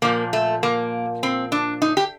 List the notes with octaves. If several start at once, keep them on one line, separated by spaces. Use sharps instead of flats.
A#2 F3 A#3
A3
A#3
C4
D4
D#4
G4